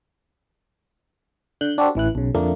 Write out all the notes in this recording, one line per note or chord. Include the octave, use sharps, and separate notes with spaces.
D3 F#6 G6
D4 F#4 G4 A4 C5
A1 E3 E4 F#6
B1 C#3
F2 D3 A3 A#3